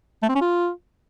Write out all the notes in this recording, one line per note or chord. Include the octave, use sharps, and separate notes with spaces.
A3
C4
C#4
F4